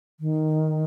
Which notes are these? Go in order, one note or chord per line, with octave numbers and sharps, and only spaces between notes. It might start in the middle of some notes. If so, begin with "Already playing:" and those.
D#3